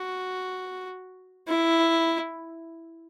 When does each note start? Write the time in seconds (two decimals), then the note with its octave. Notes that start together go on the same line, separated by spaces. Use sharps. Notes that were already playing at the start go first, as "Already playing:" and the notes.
Already playing: F#4
1.48 E4